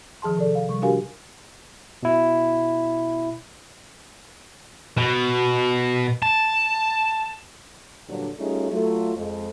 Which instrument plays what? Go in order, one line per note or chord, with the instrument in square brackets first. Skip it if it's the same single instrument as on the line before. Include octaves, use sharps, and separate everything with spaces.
[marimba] D#3 F3 G#4 A5 C6
C3 A4 D5
F5
C3 G3 C#6
D4 F#4 G4 A#4 F5 G#5
[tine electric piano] B2 E4
[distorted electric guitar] B2
A5
[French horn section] G2 A#2 D3 F#3 D4
G3 A3 C#4 D#4 F4 G#4
F#3 A3 F4
F2 G#3